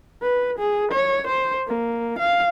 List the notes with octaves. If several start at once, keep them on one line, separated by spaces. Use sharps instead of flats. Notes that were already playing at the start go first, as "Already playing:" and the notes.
B4
G#4
C#5
C5
A#3
F5